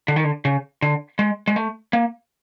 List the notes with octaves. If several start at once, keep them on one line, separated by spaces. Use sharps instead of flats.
D3
D#3
D3
C#3
D3
G#3
G#3
A3
A#3